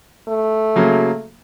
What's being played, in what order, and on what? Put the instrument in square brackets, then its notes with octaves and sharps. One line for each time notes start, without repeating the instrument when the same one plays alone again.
[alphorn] A3
[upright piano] C#3 F#3 A#3